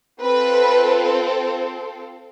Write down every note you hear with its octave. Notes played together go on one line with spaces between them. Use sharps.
C4 F4 A4 B4